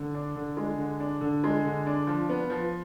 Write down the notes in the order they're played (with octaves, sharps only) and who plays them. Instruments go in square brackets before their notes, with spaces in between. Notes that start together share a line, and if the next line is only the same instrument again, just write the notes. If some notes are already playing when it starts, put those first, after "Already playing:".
Already playing: [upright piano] D3
D4
D3
G#3
D3
D4
D3
G#3
D3
D4
F3
B3
F3